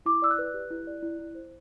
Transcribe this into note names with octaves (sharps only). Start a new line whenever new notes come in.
E4 D6
D5 E6
F#6
B4
G4
E4
D5
E4
E4
C5